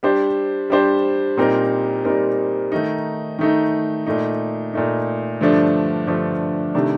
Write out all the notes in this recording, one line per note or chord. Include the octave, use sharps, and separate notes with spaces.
G3 D4 G4 C5
G3 D4 G4 C5
A#2 G3 C4 D#4 A#4
A#2 G3 C4 D#4 A#4
D#3 A3 D#4
D#3 A3 D#4
A#2 A3 D#4
A#2 A3 D#4
G2 D3 F3 A3 D4
G2 D3 F3 A3 D4
C3 D#3 A3 D4